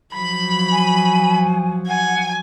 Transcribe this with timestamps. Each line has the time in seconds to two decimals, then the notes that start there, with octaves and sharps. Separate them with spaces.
0.13 F3 F#3 B5
0.72 G#5
1.87 F#5 G#5